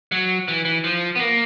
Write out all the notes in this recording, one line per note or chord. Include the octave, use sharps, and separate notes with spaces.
F#3
E3
E3
F3
B3
A#3